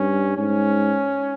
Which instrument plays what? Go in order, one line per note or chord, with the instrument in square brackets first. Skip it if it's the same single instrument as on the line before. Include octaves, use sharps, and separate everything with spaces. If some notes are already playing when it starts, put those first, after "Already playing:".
Already playing: [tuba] G2 [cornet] C#4
[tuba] G#2 [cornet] C#4